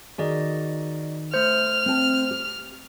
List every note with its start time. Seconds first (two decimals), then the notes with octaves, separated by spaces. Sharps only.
0.18 D#3 F#4 G#4 D5 D#5 G#5
1.34 A3 C5 F6
1.86 C4 G5 A5
2.31 G4